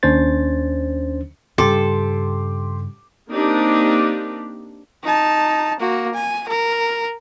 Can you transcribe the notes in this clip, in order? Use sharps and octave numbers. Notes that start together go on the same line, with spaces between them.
D#2 C#4 D4 C5 A6
G2 C#3 G4 A4 C6 D6
A#3 C4 D4 D#4 G4
D#4 A5
A#3 F#4
G#5
A#4